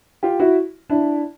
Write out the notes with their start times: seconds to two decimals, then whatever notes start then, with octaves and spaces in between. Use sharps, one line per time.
0.23 F4 G4
0.40 E4 F#4
0.89 D4 E4